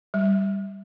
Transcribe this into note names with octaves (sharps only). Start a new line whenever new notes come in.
G3